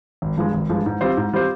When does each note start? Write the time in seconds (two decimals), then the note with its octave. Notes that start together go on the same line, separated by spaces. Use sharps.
0.22 G#1
0.38 G2 F3 G#3
0.54 G#1
0.70 G2 F3 G#3
0.86 G#2
1.01 G3 C4 F4 C5
1.17 G#2
1.34 G3 C4 F4 C5